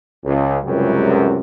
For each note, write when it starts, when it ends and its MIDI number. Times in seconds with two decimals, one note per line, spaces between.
0.25 0.57 37
0.65 1.41 37
0.65 1.41 42
0.65 1.41 48
0.65 1.41 55